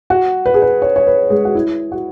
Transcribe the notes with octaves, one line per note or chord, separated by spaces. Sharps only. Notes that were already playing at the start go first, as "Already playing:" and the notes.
F#4
B4
G#4
B4
C#5
C#5
B4
G#3
F#4
E4
F#4